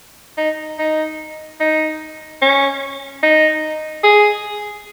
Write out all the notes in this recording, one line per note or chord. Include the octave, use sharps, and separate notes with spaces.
D#4
D#4
D#4
C#4
D#4
G#4